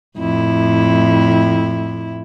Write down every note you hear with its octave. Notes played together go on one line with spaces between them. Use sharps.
F2 A2 E4